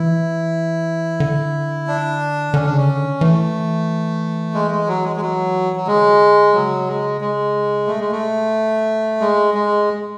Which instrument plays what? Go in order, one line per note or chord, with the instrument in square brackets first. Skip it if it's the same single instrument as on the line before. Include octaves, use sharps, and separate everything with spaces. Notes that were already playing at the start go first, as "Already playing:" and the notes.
Already playing: [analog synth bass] E3 [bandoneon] E4
[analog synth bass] D3
[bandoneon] D4
[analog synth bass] D3 [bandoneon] C#4
[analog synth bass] C#3 [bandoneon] D4
[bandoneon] C#4
[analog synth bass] D3
[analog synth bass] E3 [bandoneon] A3
[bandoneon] G#3
G#3
F#3
G#3
G#3
F#3
F#3
[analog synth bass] D3 [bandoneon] G#3
[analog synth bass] C#3 [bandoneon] F#3
[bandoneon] G#3
G#3
[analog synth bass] B2 [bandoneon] A3
[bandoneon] G#3
A3
[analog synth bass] A2 [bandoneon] G#3
[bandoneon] G#3